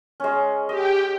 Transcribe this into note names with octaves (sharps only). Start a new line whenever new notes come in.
G#3 C#4
G4 D#5 G5